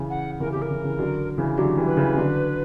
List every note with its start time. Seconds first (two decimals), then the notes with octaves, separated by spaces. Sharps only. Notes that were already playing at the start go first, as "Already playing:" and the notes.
Already playing: C#3 E3
0.10 F#5
0.40 C#3 E3 A#4
0.52 C#3 G4
0.62 A#4
0.70 C#3 E3
0.84 C#3 E3
0.99 D3 F#3
1.38 C#3 E3
1.57 D3 F#3 G4
1.77 E3 G3
1.86 B4
1.97 C#3 E3
2.16 D3 F#3